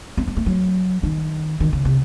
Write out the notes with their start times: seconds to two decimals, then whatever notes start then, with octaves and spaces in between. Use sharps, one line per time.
0.17 C4
0.28 C4
0.37 A3
0.46 F#3
1.03 D#3
1.60 D#3
1.73 C#3
1.85 C3